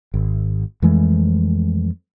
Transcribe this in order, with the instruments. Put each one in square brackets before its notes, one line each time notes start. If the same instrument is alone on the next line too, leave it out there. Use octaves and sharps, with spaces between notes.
[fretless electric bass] G#1
F2 E3 G#3 A3